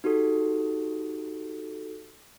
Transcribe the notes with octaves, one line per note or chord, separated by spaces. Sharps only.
D#4 F#4 G4 A4